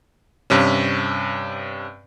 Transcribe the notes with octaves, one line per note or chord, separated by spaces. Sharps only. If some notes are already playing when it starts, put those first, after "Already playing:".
G2 C3 C#4